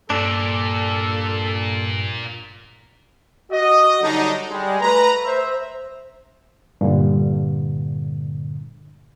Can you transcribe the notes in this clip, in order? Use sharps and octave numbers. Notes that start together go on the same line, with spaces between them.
G2 A#2 D4 A4
F#4 D#5
D3 F#3 G3 D4 D#4
G3 G#3
A3 B4 A#5
C5 E5
G2 A#2 D3